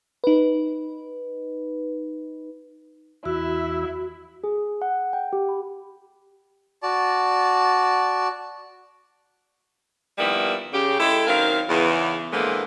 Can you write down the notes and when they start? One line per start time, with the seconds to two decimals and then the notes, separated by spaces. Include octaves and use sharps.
0.24 D#4 B4
3.25 E2 E4 F#4 E5
4.44 G#4
4.82 F#5
5.13 G5
5.33 G4
5.49 B5
6.82 F#4 D5 A5
10.18 D#3 F3 G3 A#3 B3 E4
10.73 C#3 G4
10.99 G#3 E4 G4 A4
11.27 F#2 D#3 C4 A#4 F5
11.69 E2 C#3 E3
12.31 A#2 D3 E3 F3 G#3 A#3